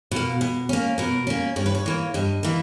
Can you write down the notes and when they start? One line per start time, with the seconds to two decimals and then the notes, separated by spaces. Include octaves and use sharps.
0.11 B2 A#3
0.41 B2
0.69 A#3 C#4
0.98 B2 A#4
1.27 A#3 C#4
1.56 G2 C#5
1.66 B4
1.75 C#5
1.86 E3 A#3
2.14 G2 D#5
2.43 E3 A#3